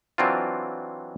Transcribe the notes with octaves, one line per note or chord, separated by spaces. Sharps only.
E3 F#3 C4 D4 F4